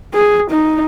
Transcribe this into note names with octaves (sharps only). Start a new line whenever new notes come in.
G#4
D#4